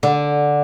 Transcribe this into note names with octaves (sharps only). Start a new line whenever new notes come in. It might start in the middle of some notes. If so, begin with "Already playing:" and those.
D3